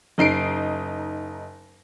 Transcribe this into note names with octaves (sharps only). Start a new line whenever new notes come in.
F#1 D#4 C7 D7